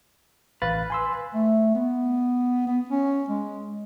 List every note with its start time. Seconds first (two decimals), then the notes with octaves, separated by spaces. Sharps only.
0.62 A1 B4 F5 A6
0.90 G#5 C6 E6
1.34 A3
1.75 B3
2.67 B3
2.89 C#4
3.28 G#3